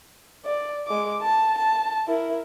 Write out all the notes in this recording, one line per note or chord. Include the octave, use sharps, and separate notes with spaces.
D5
G#3 D6
A5
A5
E4 A#4